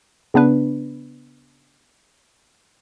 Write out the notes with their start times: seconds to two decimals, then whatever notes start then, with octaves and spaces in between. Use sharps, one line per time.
0.34 C#3 B3 D4 B4